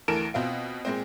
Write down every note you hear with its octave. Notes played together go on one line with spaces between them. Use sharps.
D2 E3 A4 A#4 D7 E7
B2 C4 F4
A#2 G#3 C4